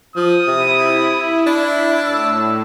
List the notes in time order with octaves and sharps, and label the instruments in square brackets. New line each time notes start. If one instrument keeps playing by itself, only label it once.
[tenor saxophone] F3 [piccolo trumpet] D#6
[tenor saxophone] C3 [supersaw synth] E4
[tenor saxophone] D4
[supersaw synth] A2 [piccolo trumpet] E6